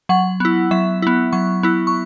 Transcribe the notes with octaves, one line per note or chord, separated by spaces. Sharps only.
F#3 F#5
B3 E4
F#3 E5
B3 E4
F#3 C#6
B3 E4
C#6